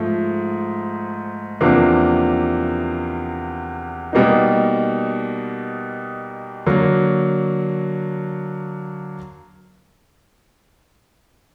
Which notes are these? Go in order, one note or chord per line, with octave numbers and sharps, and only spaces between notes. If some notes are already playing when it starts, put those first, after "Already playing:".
Already playing: G#2 F3 A3
E2 C3 F3 A#3 D4
B2 G3 A#3 D#4
D3 F#3 A#3